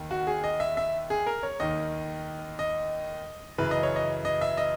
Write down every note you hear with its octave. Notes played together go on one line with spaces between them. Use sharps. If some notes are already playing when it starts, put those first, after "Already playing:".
Already playing: D#2 D#3
F#4
G#4
D#5
E5
E5
G#4
A#4
C#5
D#2 D#3 D#5
D#5
F#2 C#3 E3 B4
D#5
C#5
D#5
D#5
E5
D#5